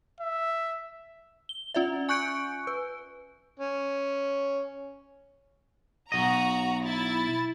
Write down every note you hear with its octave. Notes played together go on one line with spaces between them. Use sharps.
E5
G7
C#4 F4 D5 E5
G#5 C#6 F#6 G6 C#7 D7
B4
C#4
B1 F#4 D#5 A#5
E4 A6